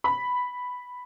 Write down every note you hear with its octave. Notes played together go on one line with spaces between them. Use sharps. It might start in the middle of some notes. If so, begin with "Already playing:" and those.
B5